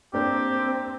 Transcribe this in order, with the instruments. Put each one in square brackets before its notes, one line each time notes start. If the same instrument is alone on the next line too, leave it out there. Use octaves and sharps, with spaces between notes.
[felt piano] A#3 D4 [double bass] C4 [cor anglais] G4